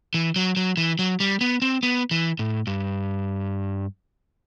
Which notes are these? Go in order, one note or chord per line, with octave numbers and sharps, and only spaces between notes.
E3
F#3
F#3
E3
F#3
G3
B3
C4
B3
E3
A2
G2